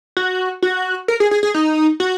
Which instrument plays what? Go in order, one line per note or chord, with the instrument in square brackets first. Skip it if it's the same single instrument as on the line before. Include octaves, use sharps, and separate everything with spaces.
[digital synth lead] F#4
F#4
A#4
G#4
G#4
G#4
D#4
F#4